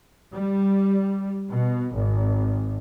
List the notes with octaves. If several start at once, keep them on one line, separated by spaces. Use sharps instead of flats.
G3
B2
G#1